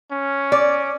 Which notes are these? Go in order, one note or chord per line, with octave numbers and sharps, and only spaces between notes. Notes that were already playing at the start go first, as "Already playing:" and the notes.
C#4
D5